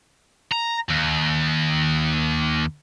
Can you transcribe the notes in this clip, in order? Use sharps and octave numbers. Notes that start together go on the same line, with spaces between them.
A#5
D#2